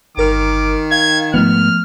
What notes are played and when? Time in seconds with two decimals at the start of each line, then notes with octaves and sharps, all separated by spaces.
0.17 G1 D#3 A#4 D6 F6
0.91 F5 G#6
1.34 G#2 F3 A3 B3 F6